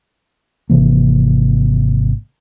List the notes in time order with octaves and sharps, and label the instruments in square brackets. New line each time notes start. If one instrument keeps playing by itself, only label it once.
[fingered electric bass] G#1 C3 E3 A#3